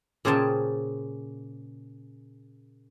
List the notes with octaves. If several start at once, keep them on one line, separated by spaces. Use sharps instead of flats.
A#2 C#3 G#4 C5 G5 A5